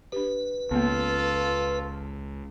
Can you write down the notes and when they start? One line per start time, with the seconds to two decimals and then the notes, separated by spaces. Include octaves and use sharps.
0.12 D4 G4 B4
0.71 C#2 A#3 B3 F4 A4